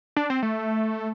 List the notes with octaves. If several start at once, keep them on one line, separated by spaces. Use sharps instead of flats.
D4
C4
A3